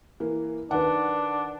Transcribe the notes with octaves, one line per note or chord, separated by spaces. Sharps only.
E3 A#3
D#3 D4 B4 F#5